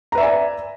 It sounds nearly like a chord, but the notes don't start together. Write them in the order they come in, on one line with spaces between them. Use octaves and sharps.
A#5 B4 E5 D5 G#5